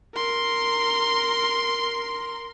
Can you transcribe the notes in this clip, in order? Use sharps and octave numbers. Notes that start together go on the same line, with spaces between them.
A#4 C6